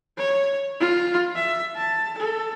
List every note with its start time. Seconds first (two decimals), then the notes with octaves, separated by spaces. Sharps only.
0.17 C#5
0.80 F4
1.36 E5
1.76 A5
2.18 A4